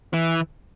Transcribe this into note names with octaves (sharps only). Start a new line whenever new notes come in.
E3